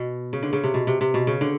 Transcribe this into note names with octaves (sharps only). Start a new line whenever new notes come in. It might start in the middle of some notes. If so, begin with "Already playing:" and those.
Already playing: B2
C#3
D3
C#3
C3
B2
C3
C3
B2
C#3
D3